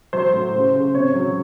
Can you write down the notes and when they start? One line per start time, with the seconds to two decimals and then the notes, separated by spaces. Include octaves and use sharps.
0.13 F#3 C5
0.33 A2
0.54 C#3
0.74 C#3
0.95 C3 C#5
1.15 F#3